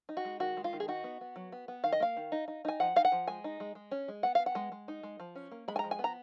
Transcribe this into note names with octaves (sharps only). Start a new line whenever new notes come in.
D#4
F#4
G#3
D#3 F#4
G#3
F4
D#3
G#4
D#4 F#4
B3
B3
F#3
B3
B3
D#3 F5
D#5
A#3 F5
D#3
D#4
D#4
D#4 G#5
F3 F#5
D#4 F5
F#5
F3
G#3 G#5
D#4
G#3
G#3
C#4
G#3
B3 F#5
B3 F5
F#5
G#3
G#3
D#4
G#3
F3
C#4
A#3
G#3 B5
G#5
F3 A#5
G#5
B3
A#5